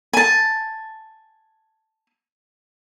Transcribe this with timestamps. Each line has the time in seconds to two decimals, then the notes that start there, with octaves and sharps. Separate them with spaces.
0.13 G#5 A5